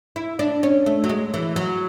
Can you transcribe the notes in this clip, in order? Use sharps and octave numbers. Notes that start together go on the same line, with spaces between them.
E4
D4
C#4
A3
F#3
G#3
E3
F#3